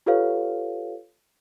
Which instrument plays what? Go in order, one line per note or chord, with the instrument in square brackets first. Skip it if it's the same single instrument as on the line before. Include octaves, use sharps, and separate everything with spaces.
[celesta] F4 G4 A4 B4 C#5 F5